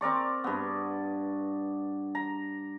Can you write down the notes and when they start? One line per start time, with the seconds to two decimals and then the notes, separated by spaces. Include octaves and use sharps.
0.01 C4 A#4 D5 C#6
0.44 G2 B3
2.15 A#5